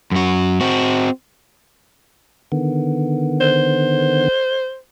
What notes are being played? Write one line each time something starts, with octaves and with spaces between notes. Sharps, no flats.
F#2 F#4
C4 F#4
D3 D#3 B3
C5